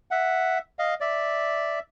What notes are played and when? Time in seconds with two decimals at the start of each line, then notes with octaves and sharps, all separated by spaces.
0.11 E5 F#5
0.79 D#5 F5
1.00 D5 E5